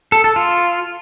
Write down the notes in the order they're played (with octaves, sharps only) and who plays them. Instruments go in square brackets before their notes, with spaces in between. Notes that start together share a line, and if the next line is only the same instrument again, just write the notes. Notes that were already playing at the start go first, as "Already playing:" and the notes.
[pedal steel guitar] A4
A4
F4